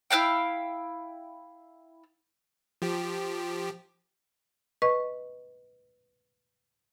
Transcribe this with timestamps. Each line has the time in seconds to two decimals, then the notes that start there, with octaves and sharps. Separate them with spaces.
0.10 E4 C5 F5 G5
2.82 F3 G4
4.82 B4 D#5 C#6